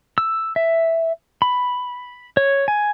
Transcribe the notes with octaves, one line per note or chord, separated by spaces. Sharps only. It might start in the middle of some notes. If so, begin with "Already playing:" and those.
E6
E5
B5
C#5
G#5